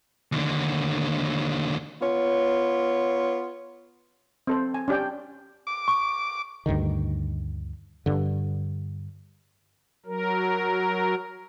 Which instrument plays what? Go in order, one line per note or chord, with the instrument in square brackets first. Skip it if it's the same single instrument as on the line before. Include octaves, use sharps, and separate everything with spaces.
[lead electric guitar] D#2 D3
[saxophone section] B3 F4 C#5
[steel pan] C4 A4 C5
G#5
C#4 D4 G4 D5 G5
[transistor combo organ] D6
[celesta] C#6
[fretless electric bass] D2 G2 D3 D#3
G2 D3
[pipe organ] F#3 A#4